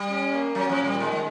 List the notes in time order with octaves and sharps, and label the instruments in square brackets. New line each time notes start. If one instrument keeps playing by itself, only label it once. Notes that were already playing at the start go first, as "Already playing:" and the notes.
Already playing: [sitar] G3
[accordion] C#4
A#3
[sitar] F#3 [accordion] C#4
[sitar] F3
[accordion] A#2
[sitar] G3
[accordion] D#3 [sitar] G#3
[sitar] G#3